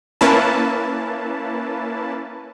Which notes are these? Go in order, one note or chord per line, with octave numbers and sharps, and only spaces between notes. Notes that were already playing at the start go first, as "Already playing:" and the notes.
A#3 C#4 E4 B4 A5